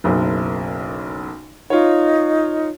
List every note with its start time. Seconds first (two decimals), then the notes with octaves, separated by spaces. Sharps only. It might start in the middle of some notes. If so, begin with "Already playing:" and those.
0.04 F#1 B1 F#2
1.70 D#4 F4 C#5